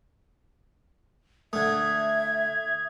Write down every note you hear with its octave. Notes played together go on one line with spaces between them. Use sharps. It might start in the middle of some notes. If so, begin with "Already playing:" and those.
D3 A3 E5 D#6 G#6